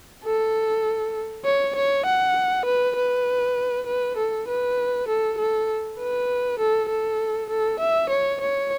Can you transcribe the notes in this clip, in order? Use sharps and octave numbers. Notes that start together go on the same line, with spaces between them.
A4
C#5
C#5
F#5
B4
B4
B4
A4
B4
A4
A4
B4
A4
A4
A4
E5
C#5
C#5